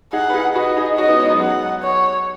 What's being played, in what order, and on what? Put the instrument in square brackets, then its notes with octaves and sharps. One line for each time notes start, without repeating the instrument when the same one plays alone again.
[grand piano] D#4 G#4 [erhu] F#5
[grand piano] B4
D#4 G#4
[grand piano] F#4 B4 [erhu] D#5
[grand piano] D#4 G#4
[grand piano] C#4 F#4 [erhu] D#5
[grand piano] B3 D#4
G#3 C#4
F#3 B3
[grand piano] F#3 [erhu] F#5
[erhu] C#5